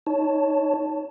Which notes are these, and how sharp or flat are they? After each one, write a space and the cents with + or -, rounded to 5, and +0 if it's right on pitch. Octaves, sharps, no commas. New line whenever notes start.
D#4 +5 C#5 +5 A5 +0